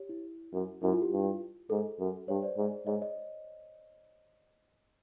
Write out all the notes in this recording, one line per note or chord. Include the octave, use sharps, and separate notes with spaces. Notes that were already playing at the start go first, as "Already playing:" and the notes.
Already playing: G4 C#5
E4
F#2
F#2 E4
F4
G4
G2
G#2 A4
F#2
G2 C#5
C5 D5
G#2
G#2 C#5 D#5
C#5 D#5